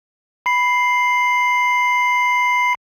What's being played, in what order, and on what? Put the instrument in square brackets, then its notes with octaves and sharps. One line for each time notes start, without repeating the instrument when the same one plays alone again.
[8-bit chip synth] B5 C7